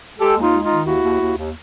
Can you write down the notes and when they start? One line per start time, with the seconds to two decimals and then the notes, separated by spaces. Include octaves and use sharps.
0.19 G#3 G4 A4
0.36 D#2
0.41 D#4 F4
0.53 G#3
0.64 D#4 F4
0.70 D#3
0.86 D#2 E4 F#4
1.03 D#2
1.21 D#2
1.37 D#2